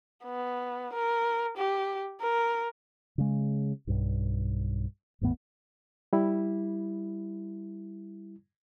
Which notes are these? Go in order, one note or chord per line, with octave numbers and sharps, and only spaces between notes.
B3
A#4
G4
A#4
C#3 G#3
B1 G2
G#1 E2 A2 B3
G3 E4